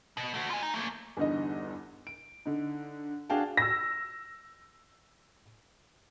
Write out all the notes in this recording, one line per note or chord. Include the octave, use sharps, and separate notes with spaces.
B2
A3 F#4
F4 G#5
D#4
A3 A#3
E2 G2 D3 D#4 D#5
D7
D3 D#4
D4 F#4 G#4 F5 G5 A5
E6 A#6